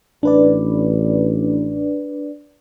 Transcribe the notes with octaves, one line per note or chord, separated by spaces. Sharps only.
A1 D4 B4 D5